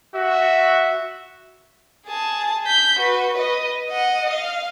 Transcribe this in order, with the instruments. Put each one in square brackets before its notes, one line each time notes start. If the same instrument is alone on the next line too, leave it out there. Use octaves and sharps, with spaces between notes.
[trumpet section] F#4 E5
[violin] G#4 A5
G6 B6
F#4 B4
B4 D#5
D#5 F#5
F5